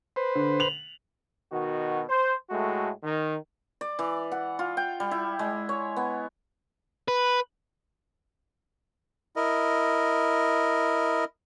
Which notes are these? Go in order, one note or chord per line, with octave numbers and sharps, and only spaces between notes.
B4 C5
D3
F7 F#7
B2 D#3 F#4
C5
A2 G#3 A3 F#4
D#3
D5
E3
F#5
F4
G5
G3
E4
G#3
C#5
B3
B4
E4 A#4 D#5